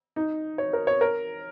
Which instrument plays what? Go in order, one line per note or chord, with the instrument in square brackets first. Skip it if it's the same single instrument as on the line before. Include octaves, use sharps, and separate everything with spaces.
[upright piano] D#4
C#5
A#4
C#5
A#4